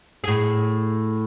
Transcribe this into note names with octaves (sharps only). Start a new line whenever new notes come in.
A2 G#4